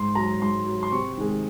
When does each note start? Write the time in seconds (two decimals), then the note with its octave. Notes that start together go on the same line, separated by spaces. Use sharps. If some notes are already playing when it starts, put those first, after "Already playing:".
Already playing: G#2 C6
0.15 F#3 A#5
0.42 G#2 C6
0.66 F#3
0.83 C6
0.92 C3 C#6
1.18 D#3 G#3